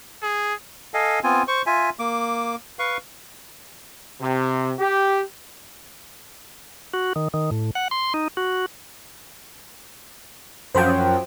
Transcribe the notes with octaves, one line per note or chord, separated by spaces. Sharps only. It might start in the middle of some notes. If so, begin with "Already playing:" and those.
G#4
A4 D#5 F5 G#5
B3 C4 F4 G#5
C5 C#6
F4 E5 G#5
A#3 D6
B4 F5 C#6
C3
G4
F#4
D#3
D#3
A2
F#5
C6
D#4
F#4
F#2 F3 F#3 C5 G5